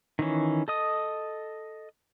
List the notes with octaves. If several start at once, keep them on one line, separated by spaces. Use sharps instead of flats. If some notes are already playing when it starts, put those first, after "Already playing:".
D#3 E3 C#4
A4 D#5 D#6